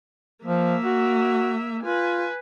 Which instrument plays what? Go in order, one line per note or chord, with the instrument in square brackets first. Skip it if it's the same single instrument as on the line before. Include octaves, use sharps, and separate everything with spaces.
[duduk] F3 [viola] A#3 E5
[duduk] F#4
[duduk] F4 [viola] B4 G#5